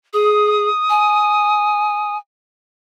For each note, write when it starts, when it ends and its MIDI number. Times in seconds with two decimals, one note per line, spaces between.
0.13 0.69 68
0.13 2.15 87
0.90 2.18 80